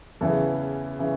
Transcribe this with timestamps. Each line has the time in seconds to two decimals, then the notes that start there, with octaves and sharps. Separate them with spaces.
0.21 E2 C#3 E3 A4
0.99 C#3 E3